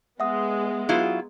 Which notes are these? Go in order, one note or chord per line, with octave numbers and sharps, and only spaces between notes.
G#3 B3 E5 F#5 D#6
F#3 E4 F4